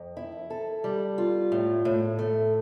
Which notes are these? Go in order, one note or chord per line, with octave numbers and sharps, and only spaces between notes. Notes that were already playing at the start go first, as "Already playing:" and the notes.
Already playing: F2
E4
A4
G3
F4
A2
A2
A3